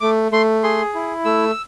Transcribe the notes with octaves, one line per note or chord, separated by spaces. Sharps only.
A3 D6
A3 C6
G#4 C6
E4
A3 E6